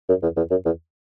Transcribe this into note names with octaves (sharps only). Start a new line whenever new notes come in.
F#2
E2
E2
F#2
E2